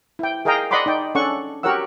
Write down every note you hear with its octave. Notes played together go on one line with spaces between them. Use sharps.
E4 G5
G#4 A#4 D#5 F5 G5 A#5
D5 D#5 F#5 B5 C6 D6
D#4 D5 G5
C#4 D4 A4 F#5 C#6
F#4 G4 A#4 C#5 F#5 E6